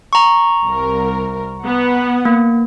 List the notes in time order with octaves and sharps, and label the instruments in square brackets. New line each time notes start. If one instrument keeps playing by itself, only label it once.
[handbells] A#5 C#6
[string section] C2 A#4
B3 F#5
[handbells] A#3